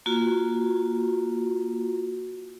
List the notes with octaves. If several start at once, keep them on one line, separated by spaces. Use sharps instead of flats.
A#3 F4 F#4